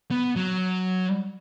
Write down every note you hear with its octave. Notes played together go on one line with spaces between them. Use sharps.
B3
F#3